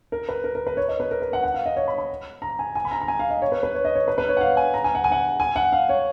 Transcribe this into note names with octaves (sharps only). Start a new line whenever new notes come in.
A#4
B4
A#4
A#4
B4
C#5
D#5
B4
A#4
B4
F#5
F#5
F5
D#5
C#5
B5
B5
A#5
G#5
G#5
B5
A#5
A#5
G#5
F5
D#5
C#5
B4
B4
C#5
D#5
C#5
B4
B4
C#5
F#5
F5
G#5
A#5
G#5
F#5
G#5
F#5
G#5
F#5
F5
C#5